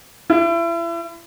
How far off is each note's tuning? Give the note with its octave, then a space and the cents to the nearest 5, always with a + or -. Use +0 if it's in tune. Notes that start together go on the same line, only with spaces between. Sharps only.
E4 +35